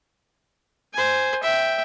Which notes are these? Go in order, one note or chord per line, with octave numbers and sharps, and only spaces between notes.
C5 G#5
E5 G5